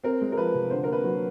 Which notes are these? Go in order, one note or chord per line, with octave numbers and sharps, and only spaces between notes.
C4 A#4
G#3
A#4
F3 B4
C3
D3 C5
A#4
A#3 B4
F#3